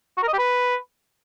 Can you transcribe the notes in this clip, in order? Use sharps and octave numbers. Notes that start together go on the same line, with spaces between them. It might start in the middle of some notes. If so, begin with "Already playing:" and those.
F#4
A#4
D#5
G4
B4